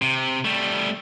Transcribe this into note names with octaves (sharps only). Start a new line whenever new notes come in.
C3
G3 A3